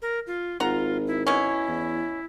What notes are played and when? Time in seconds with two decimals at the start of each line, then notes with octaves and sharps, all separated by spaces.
0.02 A#4
0.27 F4
0.60 G#1 F4 F#5 A#5
1.07 E4
1.27 B2 C#4 E4
1.68 E2